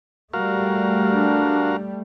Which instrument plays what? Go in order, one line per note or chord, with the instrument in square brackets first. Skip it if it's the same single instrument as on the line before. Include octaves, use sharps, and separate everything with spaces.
[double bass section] G3 A3 [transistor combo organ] F#4 A#4 F5
[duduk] D4